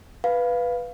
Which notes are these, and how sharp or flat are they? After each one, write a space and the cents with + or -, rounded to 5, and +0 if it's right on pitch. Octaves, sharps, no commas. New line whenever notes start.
B4 +0 F5 +0